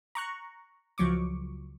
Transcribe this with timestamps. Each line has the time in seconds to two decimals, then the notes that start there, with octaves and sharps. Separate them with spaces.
0.15 A#5 C#6 F#6
0.98 C#2 F3 F#3 C#6 D6